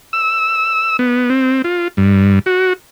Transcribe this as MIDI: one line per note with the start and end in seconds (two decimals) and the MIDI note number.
0.13 0.97 88
0.99 1.30 59
1.30 1.62 60
1.64 1.88 65
1.97 2.39 43
2.46 2.73 66